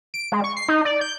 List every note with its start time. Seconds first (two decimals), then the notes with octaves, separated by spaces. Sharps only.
0.14 D7
0.32 G#3
0.44 C#6
0.57 C7
0.68 D#4
0.85 D5
1.01 G6